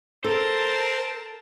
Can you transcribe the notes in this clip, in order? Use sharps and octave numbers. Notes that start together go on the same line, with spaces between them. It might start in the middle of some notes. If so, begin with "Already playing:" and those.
C4 A4 A#4 C5 A5